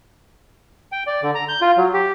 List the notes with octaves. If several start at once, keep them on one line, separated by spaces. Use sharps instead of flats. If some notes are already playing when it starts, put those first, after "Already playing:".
G5
D5
D3
A#5
G6
F4
F#3
G4